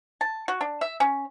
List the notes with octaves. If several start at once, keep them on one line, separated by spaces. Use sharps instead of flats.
A5
F#4
D4
E5
C#4